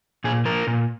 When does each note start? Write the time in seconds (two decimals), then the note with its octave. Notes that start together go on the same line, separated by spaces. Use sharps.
0.24 A#2 G#4
0.45 F3 A#3 A#4
0.67 A#2